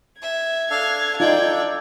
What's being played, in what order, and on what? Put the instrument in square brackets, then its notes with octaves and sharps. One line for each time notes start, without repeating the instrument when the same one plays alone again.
[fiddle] E5 [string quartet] G#6
[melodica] D4 A4 [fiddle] F5
[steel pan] D#4 F4 [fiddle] D5 G5